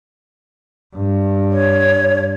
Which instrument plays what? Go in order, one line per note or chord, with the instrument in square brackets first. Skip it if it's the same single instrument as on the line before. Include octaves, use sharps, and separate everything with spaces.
[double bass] G2
[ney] C#5